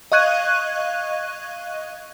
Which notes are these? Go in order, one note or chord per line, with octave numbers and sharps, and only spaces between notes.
D#5 F5 C#6 F#6 G#6 D#7